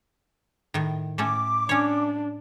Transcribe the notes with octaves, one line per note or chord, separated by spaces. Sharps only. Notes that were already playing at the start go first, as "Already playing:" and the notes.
A2 D#3
A2 A3 C#4 D6
C#4 D4 C#5